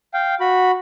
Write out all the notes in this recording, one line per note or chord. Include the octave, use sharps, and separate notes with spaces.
F5 G5
F#4 B5